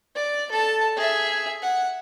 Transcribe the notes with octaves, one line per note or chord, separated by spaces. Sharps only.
D5
A4 A5
G#4 E5
F#5